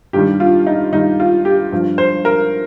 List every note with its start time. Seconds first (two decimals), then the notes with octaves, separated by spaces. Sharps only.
0.13 G2 D#3 G3 G4
0.40 F4
0.67 D#4
0.92 G2 D#3 G3 D#4
1.20 F4
1.45 G4
1.72 G2 F3
1.98 C5
2.25 A#4